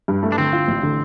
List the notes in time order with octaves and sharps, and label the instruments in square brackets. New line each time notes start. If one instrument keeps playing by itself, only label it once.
[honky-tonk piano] G2
A3
[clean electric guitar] D4
[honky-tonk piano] D3 [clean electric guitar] C4
[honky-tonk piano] F4
A1
D3